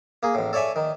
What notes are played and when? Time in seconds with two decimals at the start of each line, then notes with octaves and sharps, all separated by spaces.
0.23 A#3 G#4
0.35 A1 A2
0.53 A4 C#5 D5 E5 G#5
0.76 D#3